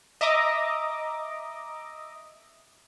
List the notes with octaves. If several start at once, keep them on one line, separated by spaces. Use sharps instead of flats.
D#5 E5 A#5 D6 D#6